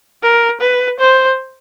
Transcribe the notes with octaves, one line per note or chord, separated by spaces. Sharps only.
A#4
B4
C5